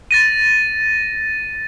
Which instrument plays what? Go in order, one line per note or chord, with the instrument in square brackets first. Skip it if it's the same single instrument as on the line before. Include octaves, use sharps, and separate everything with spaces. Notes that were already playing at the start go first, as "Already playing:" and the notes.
[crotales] A6 A#6 D#7